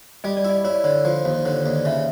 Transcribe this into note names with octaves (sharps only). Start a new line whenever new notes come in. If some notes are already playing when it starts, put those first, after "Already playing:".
G3 D#5
D5
E4
D#5
E4 C#5
D5
D3 C#5
F3 C5
D#2 C5
D3 C#5
D#2 D5
C#3 E5